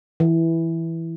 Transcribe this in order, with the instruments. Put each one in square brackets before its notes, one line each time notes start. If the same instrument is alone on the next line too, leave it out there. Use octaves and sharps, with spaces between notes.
[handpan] E3